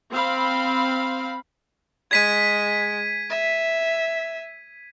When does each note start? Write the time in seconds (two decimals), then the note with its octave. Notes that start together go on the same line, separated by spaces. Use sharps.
0.12 C4 F5 B5
2.11 G#3 G#6 B6 D#7
3.30 E5